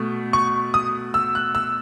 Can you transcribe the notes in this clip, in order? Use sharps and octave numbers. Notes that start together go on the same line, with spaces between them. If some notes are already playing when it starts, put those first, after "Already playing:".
Already playing: B2 A3
C#6
D#6
E6
F#6
E6